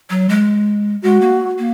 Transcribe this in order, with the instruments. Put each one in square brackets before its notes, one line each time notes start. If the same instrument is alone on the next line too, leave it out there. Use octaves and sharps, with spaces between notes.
[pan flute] F#3
G#3
[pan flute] G#3 [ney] F#4
[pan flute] A#3
A#3